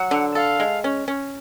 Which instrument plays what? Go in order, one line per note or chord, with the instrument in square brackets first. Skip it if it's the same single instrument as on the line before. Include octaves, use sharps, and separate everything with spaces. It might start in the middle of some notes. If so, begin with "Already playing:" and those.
Already playing: [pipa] F#3 [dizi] F#5
[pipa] D3
[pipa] A4 [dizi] F5
[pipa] G#3
C#4
C#4